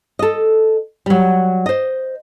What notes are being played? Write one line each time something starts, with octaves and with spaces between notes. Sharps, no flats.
A4 D#5
F#3 G3
C5 D#5